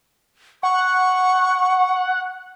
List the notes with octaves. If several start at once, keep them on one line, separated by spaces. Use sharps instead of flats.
F#5 C#6